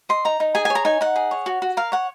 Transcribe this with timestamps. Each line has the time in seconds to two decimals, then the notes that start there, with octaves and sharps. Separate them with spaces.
0.09 D#5 C6
0.25 D#4 A#5
0.40 D#4
0.55 G#4 G#5
0.65 G#5
0.70 C#5
0.75 A#5
0.85 D#4 G#5
1.01 D#4 F#5
1.16 G#4
1.31 C#5
1.46 F#4
1.62 F#4
1.77 A#4 F5
1.92 C#5 F#5